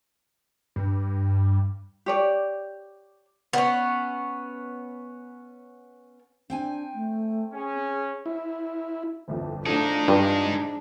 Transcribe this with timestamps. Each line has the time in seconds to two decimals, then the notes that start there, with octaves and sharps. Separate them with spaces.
0.76 G2
2.06 G4 C#5 D5
3.53 B3 C#4
6.50 C4 D4 G5 G#5
6.94 A3
7.53 C#4 G#4
8.26 E4
9.28 G1 C2 F2
9.66 A2 F3 D4 D#4 G#4 A4
10.08 G2 F4
10.45 G#2